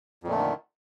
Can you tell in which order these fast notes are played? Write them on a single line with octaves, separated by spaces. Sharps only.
F2 A#2 A3 D3 D#3